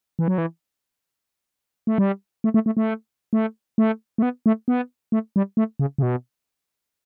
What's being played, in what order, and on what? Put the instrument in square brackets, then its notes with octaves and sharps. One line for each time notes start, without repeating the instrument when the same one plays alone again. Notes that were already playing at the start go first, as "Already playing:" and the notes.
[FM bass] E3
F#3
E3
A3
G3
A3
A3
A3
A3
A3
A3
A3
B3
A3
B3
A3
G3
A3
C#3
C#3
B2